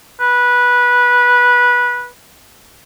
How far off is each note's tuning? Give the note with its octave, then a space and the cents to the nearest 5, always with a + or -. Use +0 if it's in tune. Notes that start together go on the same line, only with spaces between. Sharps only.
B4 -15